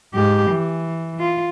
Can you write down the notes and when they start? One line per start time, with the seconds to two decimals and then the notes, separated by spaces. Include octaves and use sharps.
0.14 G#2 G4
0.51 E3
1.19 F4